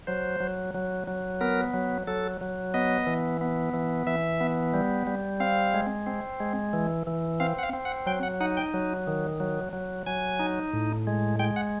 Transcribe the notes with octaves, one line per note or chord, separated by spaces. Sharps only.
F#3 C5
F#3
F#3
F#3
B3 A#4
F#3
F#3 A4
F#3
B3 D#5
E3
B3
E3
E3 E5
B3
G3
G3
C4 F5
G#3
C4
G#3
E3
E3
C4 F5
F#5
F5
C4
F#5
F#3 G5
F#5
D#4 F#5
G5
F#3
D#3
F#3
F#3
F#3 G#5
D#4
A2
G#3
G#3 G5
F#5